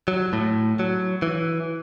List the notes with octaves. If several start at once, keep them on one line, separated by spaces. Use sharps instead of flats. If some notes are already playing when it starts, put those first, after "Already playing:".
F#3
A2
F#3
E3